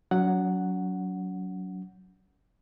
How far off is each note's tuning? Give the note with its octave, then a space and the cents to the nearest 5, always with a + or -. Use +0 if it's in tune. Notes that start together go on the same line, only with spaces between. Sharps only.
F#3 +0 C#4 +40 F#5 +0